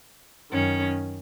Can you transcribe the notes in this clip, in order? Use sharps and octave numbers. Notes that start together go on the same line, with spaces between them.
F#2 D#3 C#4